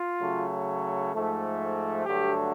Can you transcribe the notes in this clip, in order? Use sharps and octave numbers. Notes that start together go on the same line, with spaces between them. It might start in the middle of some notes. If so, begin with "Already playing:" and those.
Already playing: F4
C#3 F#3 A3
G#2 F3 A3
G2 D3 F#3 A3 G4